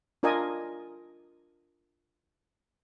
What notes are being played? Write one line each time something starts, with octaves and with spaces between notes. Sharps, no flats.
D4 F4 A#4 D5 D#5 G#5